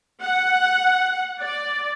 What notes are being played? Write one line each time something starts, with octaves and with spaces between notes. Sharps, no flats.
F#5
D5